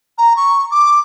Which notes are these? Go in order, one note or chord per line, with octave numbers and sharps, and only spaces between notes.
A#5
C#6
D6